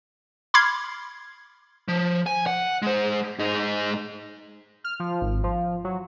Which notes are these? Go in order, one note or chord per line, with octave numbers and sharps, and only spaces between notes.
B5 C6 D6 F6 G#6 C7
F3
G#5
F#5
G#3 C5
G#2 D#4
F6
F3
G#1
F3
F#3